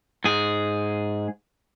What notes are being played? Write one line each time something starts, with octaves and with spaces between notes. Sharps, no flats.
G#2 G#4